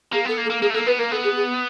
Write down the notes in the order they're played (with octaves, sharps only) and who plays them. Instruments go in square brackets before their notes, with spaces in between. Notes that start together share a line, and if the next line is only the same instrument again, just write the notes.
[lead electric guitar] A#3 [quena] G#4
[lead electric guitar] B3 [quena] A4
[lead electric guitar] A#3
[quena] A4
[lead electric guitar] A#3
[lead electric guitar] A#3 [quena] G#4
[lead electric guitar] A3
[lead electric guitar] A#3 [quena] A4
[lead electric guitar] B3 [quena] B4
[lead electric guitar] A#3 [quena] A#4
[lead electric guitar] B3 [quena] A4
[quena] G#4
G#4